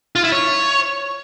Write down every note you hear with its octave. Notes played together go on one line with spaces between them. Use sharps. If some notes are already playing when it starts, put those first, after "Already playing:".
F4
E4
C#5